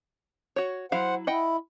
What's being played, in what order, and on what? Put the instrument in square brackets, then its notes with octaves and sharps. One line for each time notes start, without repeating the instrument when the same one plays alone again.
[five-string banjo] F#4 C#5
[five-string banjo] F#3 E4 F5 [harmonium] C5 F#5
[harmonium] E4 [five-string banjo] D#5 F#5 G5